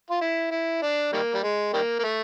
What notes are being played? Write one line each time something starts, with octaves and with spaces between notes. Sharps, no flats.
F4
E4
E4
D4
D#3 G3 A#3
G3
G#3
D#3 G3 A#3
A#3
A3